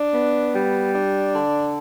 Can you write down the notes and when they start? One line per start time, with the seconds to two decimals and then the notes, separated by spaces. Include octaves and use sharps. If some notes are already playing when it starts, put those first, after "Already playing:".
Already playing: D4
0.13 B3
0.53 G3
0.93 D4
1.33 D3